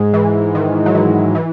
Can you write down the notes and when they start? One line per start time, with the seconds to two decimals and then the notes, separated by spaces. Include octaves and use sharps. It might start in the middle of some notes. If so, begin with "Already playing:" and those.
Already playing: G#2 G#3
0.14 E3
0.55 D#3
0.86 F#3
0.95 E3
1.35 E3